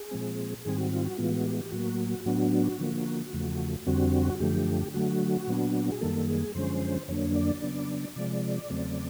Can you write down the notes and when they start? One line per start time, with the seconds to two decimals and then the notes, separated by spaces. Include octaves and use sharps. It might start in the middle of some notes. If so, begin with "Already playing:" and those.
Already playing: G#4
0.11 A#2 F3 G#3 C4
0.65 G#2 D#3 G3 C4 G#4
0.78 F#4
0.92 F4
1.05 F#4
1.18 A2 E3 G#3 B3 F4
1.32 F#4
1.45 G4
1.59 G4
1.72 A2 F#3 A#3 F#4
2.26 A2 F#3 B3 D4 F#4
2.79 D3 F3 A#3
3.33 E2 C#3 F3 A3
3.86 F2 D3 G3 C4 F#4
4.40 F#2 D3 F3 A3 G4
4.94 D3 F#3 A3 F#4
5.48 A#2 F#3 B3 D4
5.92 G#4
6.01 F#2 D#3 G3 A#3 A4
6.28 G#4
6.55 F#2 D3 F3 G#3 C#4 C5
7.08 F2 D3 F#3 A#3 D4 C#5
7.36 D5
7.62 C#3 F#3 B3 D4
8.16 C3 F3 G#3 D5
8.70 E2 C#3 F#3 A3 C4